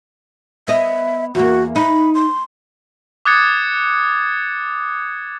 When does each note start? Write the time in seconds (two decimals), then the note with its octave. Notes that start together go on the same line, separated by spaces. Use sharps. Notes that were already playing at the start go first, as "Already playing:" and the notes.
0.68 B3 D#5 E5
1.35 E2 A#3 F#4
1.76 D#4 B5
2.15 C6
3.25 D6 D#6 F#6 G#6 A6 C#7